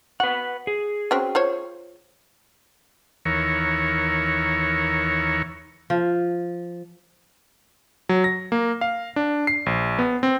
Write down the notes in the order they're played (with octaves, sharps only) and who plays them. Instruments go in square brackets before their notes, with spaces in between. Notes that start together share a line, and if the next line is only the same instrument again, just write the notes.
[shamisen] F#4 [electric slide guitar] B4 F#5
[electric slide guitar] G#4
[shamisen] C4 C#4 F#4
F4 C5 C#5
[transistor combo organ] D#2 E3 A#4 C#5
[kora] F3
[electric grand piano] F#3
A#6
A#3
F5
D4
C7
A#1
B3
C4